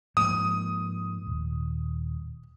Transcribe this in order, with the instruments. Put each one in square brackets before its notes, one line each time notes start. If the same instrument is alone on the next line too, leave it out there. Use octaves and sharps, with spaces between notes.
[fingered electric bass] G#2 F3 A#3 [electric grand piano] D#6
[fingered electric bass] D#1